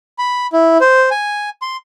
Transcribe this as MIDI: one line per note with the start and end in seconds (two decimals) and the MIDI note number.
0.19 0.47 83
0.53 0.78 64
0.81 1.10 72
1.11 1.49 80
1.62 1.77 84